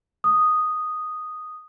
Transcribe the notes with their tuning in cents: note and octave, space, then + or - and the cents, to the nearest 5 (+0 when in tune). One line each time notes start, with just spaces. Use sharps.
D#6 -5